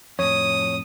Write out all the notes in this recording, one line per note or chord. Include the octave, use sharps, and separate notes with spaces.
F2 A2 C#5 D#6